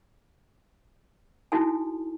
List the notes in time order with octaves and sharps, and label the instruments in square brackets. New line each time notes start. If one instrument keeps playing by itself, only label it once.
[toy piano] D#4 E4 F#4 A4 G#5